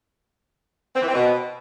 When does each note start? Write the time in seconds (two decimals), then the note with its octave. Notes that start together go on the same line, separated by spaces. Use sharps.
0.96 C4
1.02 E3
1.08 C4
1.15 B2